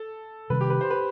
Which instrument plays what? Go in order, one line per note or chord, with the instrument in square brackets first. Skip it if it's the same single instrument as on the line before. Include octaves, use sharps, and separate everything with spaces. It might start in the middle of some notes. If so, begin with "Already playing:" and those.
Already playing: [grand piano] A4
[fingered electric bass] C3 D#3 G3 C4 [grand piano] B4
[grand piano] G4
B4
C5
B4